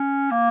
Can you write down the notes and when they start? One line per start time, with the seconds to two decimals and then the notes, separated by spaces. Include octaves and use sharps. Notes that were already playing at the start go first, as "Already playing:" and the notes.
Already playing: C#4
0.31 A#3